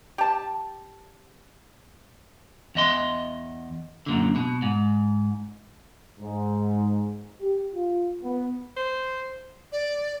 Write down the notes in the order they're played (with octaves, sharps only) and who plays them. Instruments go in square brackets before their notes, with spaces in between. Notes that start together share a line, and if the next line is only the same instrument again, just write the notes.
[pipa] G4 A5
[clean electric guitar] E2 D#5 C6
F#2 A#2 D3
B2
G#2
[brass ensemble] G#2
G4
F4
B3
[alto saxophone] C5
[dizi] D5